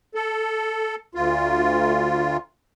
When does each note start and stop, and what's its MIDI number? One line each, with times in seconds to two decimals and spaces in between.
0.15 0.95 69
1.15 2.37 38
1.15 2.37 65